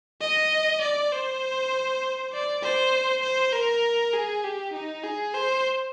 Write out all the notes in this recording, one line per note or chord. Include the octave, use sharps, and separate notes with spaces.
D#5
D5
C5
D5
C5
C5
A#4
G#4
G4
D#4
G#4
C5